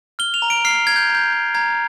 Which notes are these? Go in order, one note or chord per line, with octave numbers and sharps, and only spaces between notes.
F6 G7
F7
A#5
D7
F6 C7
F6 G#6
G6
A#5
G6
G6
A#5 G#6